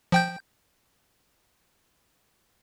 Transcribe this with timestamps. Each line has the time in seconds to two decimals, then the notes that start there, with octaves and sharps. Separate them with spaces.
0.12 F3 G5 G6